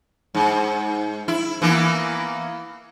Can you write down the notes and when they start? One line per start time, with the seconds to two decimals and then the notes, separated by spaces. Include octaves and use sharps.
0.35 G#2
1.28 E4
1.62 E3 A#3 B3